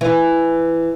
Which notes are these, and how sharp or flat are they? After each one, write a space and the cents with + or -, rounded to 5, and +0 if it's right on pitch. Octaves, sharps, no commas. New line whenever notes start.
E3 +10